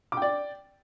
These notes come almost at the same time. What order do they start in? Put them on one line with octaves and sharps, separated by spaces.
D6 G5 D5